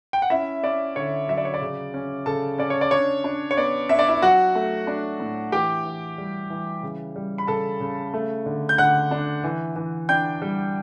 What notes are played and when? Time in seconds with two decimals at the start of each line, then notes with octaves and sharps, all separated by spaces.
0.13 G5
0.22 F#5
0.30 C#4 E4 E5
0.64 C#4 D5
0.96 D3 C#5
1.28 F#3 E5
1.37 D5
1.45 C#5
1.54 D5
1.61 C#3
1.94 C#4
2.26 C#3 A4 A5
2.58 C#4 D5
2.70 C#5
2.81 D5
2.91 D4 C#5
3.24 D4
3.51 C#5
3.57 B3 D5
3.89 D4 E5
3.99 D5
4.08 E4 E5
4.22 F#3 F#4 F#5
4.55 A3
4.87 D4
5.20 A2
5.52 E3 G4 G5
5.85 E3
6.18 G3
6.50 E3
6.83 C#3
7.16 G3
7.38 B5
7.47 C#3 A4 A5
7.80 C#3
8.14 A3
8.46 D3
8.69 G6
8.78 D3 F#5 F#6
9.11 D4
9.44 E3
9.76 E3
10.09 D4 G5 G6
10.42 G3